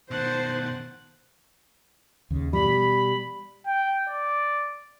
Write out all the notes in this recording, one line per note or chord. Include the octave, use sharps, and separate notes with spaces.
B2 D#3 C5 F#5 A5
D#2 C#3
B2 G3 B5
G5
D5